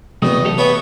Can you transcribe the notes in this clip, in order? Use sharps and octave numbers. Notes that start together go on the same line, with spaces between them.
E2 C3 F#3 A3 B3 D#5
G4 A4 D#5
B3 C#5 E5 G5